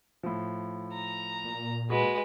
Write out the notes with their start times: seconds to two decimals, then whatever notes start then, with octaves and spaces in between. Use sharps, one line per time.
0.23 A2 F3
0.94 A#5
1.44 A#2
1.90 G#3 F#4 B4